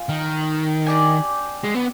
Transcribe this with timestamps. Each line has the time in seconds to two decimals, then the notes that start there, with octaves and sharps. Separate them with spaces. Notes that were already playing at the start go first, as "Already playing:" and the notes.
Already playing: F4 F5 G#5
0.09 D#3
0.86 D4 G4 D5 G#5
1.64 G#3
1.75 B3